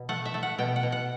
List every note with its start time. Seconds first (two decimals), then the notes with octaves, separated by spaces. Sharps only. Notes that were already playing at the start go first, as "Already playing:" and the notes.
Already playing: B2
0.09 A3 F#5
0.25 E5
0.34 A3
0.43 F#5
0.58 B2 G5
0.76 F#5
0.83 B2
0.92 F#5